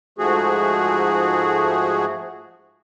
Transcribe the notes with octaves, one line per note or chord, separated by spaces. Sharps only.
G#2 F3 A3 F#4 G#4